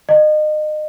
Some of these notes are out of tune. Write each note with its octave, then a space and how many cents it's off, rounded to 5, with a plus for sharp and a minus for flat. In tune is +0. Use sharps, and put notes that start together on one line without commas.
D#5 -30